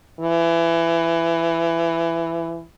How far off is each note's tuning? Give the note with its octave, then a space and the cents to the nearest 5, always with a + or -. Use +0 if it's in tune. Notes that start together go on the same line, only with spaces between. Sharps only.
E3 +20